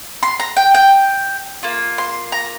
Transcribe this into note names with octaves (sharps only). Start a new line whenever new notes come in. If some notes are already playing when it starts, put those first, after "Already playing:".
C6
A#5
G5
G5
A#3 F4
C6
A#5